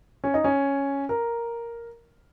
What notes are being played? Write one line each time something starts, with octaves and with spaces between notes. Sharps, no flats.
C#4
D#4
C#4
A#4